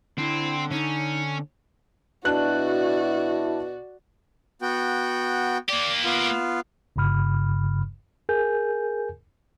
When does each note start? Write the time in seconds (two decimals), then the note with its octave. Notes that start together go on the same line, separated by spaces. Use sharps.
0.18 D3 C4 E4
0.71 C#4 D#4
2.25 B2 D4 E4 F#4 D5 F#6
4.62 B3 F#4 G5
5.69 A#3 G4 D5
6.04 B3 F4
6.96 G1 G2 C#3 B5 F6
8.29 G#4 A#4 G#5 G6